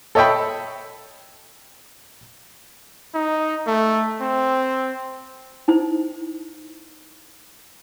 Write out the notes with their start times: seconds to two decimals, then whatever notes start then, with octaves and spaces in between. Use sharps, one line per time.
0.15 A4 C#5 D#5 E5 G5 B5
3.14 D#4
3.67 A3
4.21 C4
5.68 D#4 E4 C5